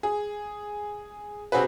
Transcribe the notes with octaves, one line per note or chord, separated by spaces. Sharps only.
G#4
C3 C4 F#4 G#4 B4